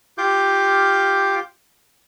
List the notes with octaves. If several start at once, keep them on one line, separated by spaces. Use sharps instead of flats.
F4 G4 F5 D6 G6